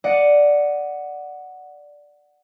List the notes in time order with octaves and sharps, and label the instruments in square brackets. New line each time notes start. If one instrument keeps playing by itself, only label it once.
[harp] D5 D#5 F#5